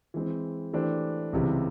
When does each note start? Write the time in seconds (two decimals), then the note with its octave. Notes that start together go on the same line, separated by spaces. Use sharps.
0.14 E3 G#3 C4
0.73 E3 A3 D4 G4 C5
1.33 C#2 C3 E3 G3